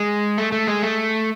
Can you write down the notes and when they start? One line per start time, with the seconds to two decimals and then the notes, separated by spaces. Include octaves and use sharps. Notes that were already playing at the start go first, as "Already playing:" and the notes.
Already playing: G#3
0.38 A3
0.52 A3
0.68 G#3
0.82 A3